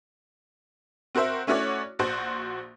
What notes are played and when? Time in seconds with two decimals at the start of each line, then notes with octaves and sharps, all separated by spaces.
1.15 C4 F#4 A#4 C5 E5
1.47 A3 C#4 E4 F#4 C#5 D5
1.99 A#1 F#4 C5